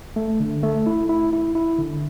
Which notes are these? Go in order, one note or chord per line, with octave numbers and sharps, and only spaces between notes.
A3
D3
A3
E4
E4
E4
E4
D3